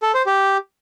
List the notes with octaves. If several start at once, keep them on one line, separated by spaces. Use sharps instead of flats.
A4
C5
G4